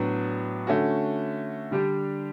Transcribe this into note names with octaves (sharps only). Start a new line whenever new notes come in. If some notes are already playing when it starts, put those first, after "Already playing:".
Already playing: A2 F#3 B3 D4
D3 A3 C#4 F#4
D3 G3 D4 G4